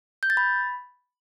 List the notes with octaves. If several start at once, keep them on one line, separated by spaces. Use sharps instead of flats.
G6
A6
B5